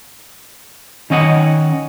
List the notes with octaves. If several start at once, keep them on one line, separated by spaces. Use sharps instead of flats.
D#3 C#4 D#5 F#5